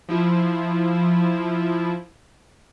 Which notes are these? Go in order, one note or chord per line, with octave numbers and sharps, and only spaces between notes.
F3 E4 F4